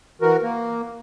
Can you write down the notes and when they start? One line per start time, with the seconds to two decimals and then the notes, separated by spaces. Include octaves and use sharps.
0.21 E3 F#4 A#4
0.43 A#3